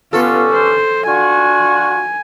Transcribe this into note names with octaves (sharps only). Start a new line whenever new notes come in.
G2 D3 B3 C#4 F4 A4
C5
D4 F4 F#4 G#5